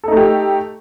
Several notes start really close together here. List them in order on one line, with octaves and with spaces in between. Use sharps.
A4 D#4 A3 G4